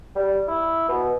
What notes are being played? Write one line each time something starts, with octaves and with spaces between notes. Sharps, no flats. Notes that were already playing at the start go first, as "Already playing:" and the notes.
G3
E4
B2